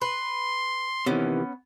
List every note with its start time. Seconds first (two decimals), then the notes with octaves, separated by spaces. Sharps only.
0.02 B4 C6
1.06 C3 D#3 E3 B3 C#4